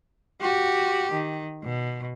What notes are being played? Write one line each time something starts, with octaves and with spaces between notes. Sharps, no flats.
F#4 G4
D#3
B2